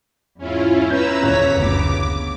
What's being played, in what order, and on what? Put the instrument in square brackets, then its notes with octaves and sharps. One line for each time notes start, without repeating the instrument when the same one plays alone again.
[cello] E2 G#2 [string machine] C#4 E4 F4
[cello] C#4 E4 [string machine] B4 A#5 E6 [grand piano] G6
[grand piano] D#1 F#6 [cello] E2 C#5 [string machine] A#5 B6
[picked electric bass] F#1 D2 [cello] C#3 B3 [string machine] D6